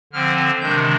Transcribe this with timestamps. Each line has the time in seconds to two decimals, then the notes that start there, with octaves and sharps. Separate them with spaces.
0.13 D3 F3 C4 F6
0.61 C3 D#3 G#3 D4 G6